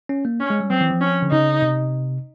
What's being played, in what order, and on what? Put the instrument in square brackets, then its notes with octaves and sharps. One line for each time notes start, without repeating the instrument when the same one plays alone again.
[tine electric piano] C#4
A#3
[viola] C#4
[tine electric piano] G#3
G3
[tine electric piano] F#3 [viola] C4
[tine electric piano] E3
F3
[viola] C#4
[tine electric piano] D3
[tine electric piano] C#3 [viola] D#4
[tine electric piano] C3